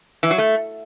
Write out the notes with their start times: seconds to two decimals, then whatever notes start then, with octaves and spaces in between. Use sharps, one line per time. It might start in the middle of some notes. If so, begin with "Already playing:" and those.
0.23 E3
0.31 F#3
0.38 A3